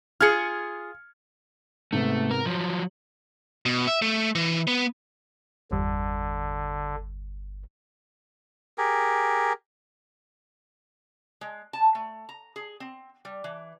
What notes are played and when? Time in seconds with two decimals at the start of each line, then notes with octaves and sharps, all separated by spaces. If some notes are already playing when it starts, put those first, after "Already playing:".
0.21 F4 G#4 F6 G#6 C#7
1.92 G#2 C3 A3 B3
2.31 A#4
2.46 F3 F#3 F#7
3.66 B2
3.87 E5
4.02 A3
4.35 E3
4.68 B3
5.71 G1 E2 D3 G3
8.78 G4 G#4 A#4
11.41 G#3
11.73 A5
11.95 A3
12.29 A#5
12.56 G#4
12.80 C4
13.25 G3
13.44 E3